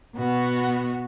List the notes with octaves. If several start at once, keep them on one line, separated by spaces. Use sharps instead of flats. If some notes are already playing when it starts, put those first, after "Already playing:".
B2 B3 F#4